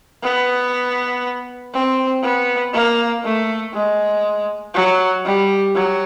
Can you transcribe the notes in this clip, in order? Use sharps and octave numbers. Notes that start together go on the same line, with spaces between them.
B3
C4
B3
A#3
A3
G#3
F#3
G3
F#3